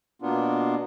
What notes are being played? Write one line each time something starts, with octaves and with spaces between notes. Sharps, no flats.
B2 A#3 B3 D4 F4